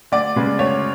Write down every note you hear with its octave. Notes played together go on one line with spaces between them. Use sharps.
D2 D5
C#3 G#3 B3
D2 C#5